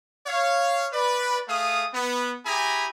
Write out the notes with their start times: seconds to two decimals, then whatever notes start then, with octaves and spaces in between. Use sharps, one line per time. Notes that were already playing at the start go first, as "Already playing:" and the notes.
0.27 C#5 F5
0.93 B4 D5
1.48 A3 G#4 F5 D#6
1.93 B3
2.45 E4 G4 G#4 G#5 A#5 B5